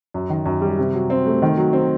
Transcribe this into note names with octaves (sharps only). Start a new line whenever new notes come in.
F#2
D#3
F#2
G3
C3
F#3
C4
A3
D#3
F#3
C4